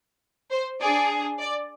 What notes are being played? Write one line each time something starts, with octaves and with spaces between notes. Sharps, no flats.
C5
D4 G#4 D5
D5